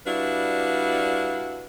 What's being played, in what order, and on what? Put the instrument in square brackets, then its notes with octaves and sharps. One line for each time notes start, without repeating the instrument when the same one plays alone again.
[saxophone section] G3 D4 E4 F#4 B4 F5